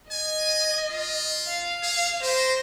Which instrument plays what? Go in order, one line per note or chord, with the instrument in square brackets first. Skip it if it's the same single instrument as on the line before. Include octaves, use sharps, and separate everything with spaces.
[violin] D#5 [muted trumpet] G#5
[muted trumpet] F4
[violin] F5
[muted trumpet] G#4
[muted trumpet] G4 [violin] C5 A#6